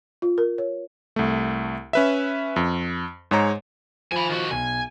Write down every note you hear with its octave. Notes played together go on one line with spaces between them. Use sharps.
F4
A#4
C#5
C2 A3
C#4 B4 E5
F2
G#2 G#3 C#5 A#5
F3 G#5 B5
D#3 F#4
B1 G#5